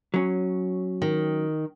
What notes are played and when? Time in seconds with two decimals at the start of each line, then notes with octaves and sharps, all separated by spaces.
0.14 F#3 C#4
1.02 D#3